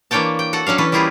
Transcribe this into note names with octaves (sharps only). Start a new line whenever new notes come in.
E3 A#3 D4 C#5 G5 A5
G5
F#4 A4 F#5
F#3 C#4 D4 F5
E3 C#4 B4 A5
G3 A#3 E4 F4 G4 G#4